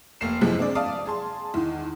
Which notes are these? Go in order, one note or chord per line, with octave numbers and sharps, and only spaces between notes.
F1 A3 A#3 C7 E7
F#2 A2 C3 F3 G#3
C4 D4 G#4 D5
D5 F5 A5 D#6
G#4 A5 C6
E2 D#3